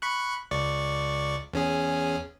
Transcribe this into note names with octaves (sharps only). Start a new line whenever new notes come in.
B5 C#6 F#6
C#2 D5 C#6
E2 C#4 G#4